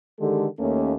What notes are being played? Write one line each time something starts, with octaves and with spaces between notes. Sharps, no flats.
D3 D#3 G#3 G4 A4
D#2 A3 A#3 C#4